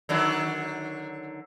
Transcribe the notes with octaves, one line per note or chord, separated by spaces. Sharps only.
D3 D#3 F#3